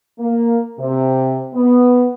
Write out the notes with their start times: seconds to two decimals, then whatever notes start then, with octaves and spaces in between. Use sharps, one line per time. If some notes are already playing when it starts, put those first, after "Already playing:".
0.19 A#3
0.79 C3
1.54 B3